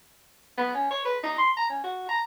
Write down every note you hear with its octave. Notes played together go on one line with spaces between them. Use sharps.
B3
C#4
C#5
B4
D#4
C6
A#5
C#4
F#4
A#5